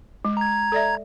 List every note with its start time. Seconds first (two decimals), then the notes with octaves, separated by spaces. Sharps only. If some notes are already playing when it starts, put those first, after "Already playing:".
0.25 G#3
0.37 A#5 G#6
0.72 A4 D5 E5